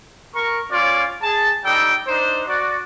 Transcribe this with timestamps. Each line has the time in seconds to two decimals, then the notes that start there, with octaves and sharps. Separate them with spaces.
0.34 A#4 C#6
0.71 C#4 F4 C#5 D5
1.23 G#4 A5
1.65 G3 D#4 A4 G5
2.07 D4 D#4 C5
2.47 F#4 D5